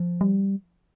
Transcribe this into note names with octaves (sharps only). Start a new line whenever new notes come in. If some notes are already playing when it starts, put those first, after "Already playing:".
Already playing: F3
G3